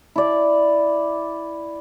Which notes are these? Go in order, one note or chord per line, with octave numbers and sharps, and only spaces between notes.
E4 D5